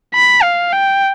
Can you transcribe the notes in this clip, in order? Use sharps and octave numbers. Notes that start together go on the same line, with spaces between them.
B5
F5
G5